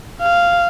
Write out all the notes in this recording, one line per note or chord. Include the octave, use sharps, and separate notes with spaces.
F5